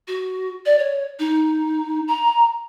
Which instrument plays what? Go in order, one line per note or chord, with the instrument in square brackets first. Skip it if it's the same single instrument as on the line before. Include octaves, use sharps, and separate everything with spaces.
[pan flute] F#4
D5
C#5
D#4
A#5